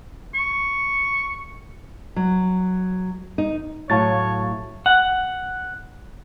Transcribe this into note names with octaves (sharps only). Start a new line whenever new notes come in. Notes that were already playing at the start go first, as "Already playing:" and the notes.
C#6
F#3
D#4
A2 F#3 C#5 F5 A5 A6
F#5